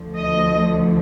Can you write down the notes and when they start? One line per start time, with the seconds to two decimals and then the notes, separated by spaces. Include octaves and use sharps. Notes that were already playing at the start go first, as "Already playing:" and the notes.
Already playing: D2 D3 F3
0.15 D#5